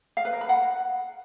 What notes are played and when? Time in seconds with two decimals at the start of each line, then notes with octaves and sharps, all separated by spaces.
0.17 F5
0.25 B4
0.33 A#4
0.41 B5
0.49 F#5